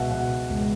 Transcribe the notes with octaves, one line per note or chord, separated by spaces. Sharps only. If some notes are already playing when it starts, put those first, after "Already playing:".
Already playing: C#2 B2 E5 F#5
B2 F#5
C#2